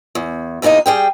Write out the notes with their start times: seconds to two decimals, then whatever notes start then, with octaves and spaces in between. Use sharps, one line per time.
0.15 E2
0.62 E2 C3 A#3 D#4 D#5
0.86 G3 G#4 G5